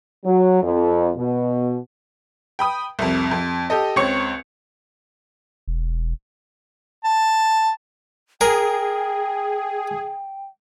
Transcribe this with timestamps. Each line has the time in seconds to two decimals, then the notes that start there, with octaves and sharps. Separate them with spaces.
0.25 F#3
0.63 F2
1.16 B2
2.59 G5 B5 D#6
2.99 C2 F2
3.31 F2
3.70 G4 A4 D#5
3.96 C#2 C4 C#5 C#6 C#7
5.68 E1
7.05 A5
8.41 G#4 A#4 G5